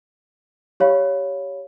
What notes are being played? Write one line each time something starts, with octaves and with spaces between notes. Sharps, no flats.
G4 C#5 F5 B5